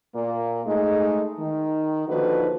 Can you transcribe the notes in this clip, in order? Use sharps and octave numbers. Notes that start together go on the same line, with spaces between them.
A#2 A#3
G#3 A3 D#4
D#3
D3 F3 A#3 D#4 F#4 B4